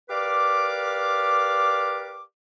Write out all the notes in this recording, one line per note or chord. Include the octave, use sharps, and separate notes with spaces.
G4 A#4 B4 D5 F5 D6